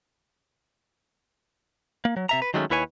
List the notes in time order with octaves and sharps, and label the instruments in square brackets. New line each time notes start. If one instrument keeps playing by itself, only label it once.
[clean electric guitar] A#3
F#3
C3 E5 A#5
B4
D#3 F#3 G#3 A3 C4 C#4
D#2 E4 B4 C#5 G#5